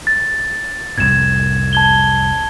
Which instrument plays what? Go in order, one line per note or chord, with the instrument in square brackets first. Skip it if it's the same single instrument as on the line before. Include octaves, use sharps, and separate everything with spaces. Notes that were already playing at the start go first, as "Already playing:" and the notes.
[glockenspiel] A6
[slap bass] C2 F2 A2 [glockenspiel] G#6 E7
[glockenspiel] A5 G#6 G7